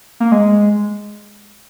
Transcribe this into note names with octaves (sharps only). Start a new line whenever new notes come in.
A#3
G#3